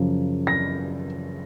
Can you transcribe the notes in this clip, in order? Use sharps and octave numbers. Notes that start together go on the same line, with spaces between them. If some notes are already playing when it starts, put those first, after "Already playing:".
Already playing: F#2 C#3 F3
A#6